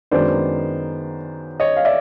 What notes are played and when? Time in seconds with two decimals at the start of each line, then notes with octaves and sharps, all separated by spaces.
0.11 F#2 D#3 G#3 B3 D4 C5 D5
1.60 C#5 D#5
1.77 F5
1.85 D5 E5